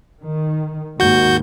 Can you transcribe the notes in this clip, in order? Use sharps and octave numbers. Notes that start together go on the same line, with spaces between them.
D#3
D#2 G#2 D#3 F#4 G6